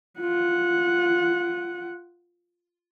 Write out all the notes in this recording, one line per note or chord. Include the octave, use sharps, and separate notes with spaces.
F4 F#5